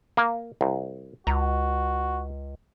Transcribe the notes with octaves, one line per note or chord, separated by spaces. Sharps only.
A#3
C2
C#2 F#4 A#5